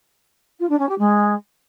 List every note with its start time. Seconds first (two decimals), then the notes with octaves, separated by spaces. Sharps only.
0.59 F4
0.69 D4
0.79 C#4
0.89 G4
0.98 G#3